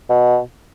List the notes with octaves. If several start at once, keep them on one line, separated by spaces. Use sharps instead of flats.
B2